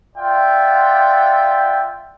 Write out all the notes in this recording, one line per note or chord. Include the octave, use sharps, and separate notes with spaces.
F4 D5 E5 F#5 G5